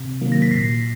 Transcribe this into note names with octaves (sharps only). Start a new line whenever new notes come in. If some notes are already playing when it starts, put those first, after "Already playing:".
Already playing: C3
D#3 F#3 A#3
A#6
B6
A#2 A#6 C7